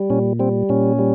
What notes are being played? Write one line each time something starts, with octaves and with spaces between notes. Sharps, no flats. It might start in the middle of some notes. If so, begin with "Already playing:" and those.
Already playing: G3
A#2 C#4
G3 C4
A#2 C#4
G3